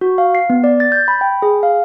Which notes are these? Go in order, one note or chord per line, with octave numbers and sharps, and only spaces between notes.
F#4
F5
C7
B3
D5
A6
G6
B5
G5
G#4
F5